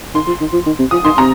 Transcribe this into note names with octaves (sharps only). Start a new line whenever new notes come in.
D#3 C6
F3
D#3
F3
D#3
C3
F3 D#6
D#3 C6
C3 A#5